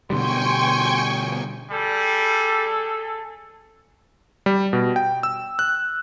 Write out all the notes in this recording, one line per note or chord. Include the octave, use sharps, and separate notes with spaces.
B2 D3 G3 G5 G#5 C6 C#6
G3 G#4 A4
G3
B2
G5
E6
F#6